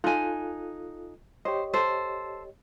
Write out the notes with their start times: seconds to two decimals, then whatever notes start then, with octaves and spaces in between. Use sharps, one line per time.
0.04 D#4 F4 A4 G#5 F#6
1.45 G4 C5 C#5 D#5
1.73 A4 C5